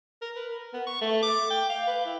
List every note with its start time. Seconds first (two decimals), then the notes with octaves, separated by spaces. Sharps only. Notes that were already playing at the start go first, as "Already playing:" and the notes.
0.22 A#4
0.36 B4
0.51 A#4
0.73 B3
0.87 C#6
1.02 A3
1.23 D6
1.51 G5
1.70 F5
1.88 B4
2.06 E4